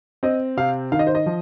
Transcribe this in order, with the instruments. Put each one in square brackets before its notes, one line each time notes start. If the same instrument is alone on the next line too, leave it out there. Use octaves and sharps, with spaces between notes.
[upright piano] C4 D#5
C3 F5
D#3 F5
D#5
C5
D#5
F3